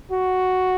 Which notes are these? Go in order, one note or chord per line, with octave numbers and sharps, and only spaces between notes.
F#4